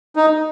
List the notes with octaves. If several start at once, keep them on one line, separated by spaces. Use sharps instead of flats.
D#4